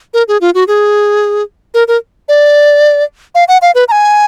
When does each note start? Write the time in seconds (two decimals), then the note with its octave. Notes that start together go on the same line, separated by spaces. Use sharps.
0.14 A#4
0.28 G#4
0.41 F4
0.55 F#4
0.68 G#4
1.74 A#4
1.88 A#4
2.29 D5
3.35 F5
3.48 F#5
3.62 F5
3.75 B4
3.88 A#5
3.92 G#5